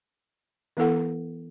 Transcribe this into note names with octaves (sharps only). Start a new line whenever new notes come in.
E3 B3 E4 A4 F#5